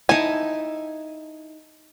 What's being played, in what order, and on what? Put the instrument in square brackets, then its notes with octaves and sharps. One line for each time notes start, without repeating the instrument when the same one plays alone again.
[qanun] D#4 E4 A5 [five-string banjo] G#5